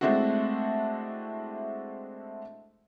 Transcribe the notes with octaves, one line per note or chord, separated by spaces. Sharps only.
G#3 A3 C4 D4 E4 F#4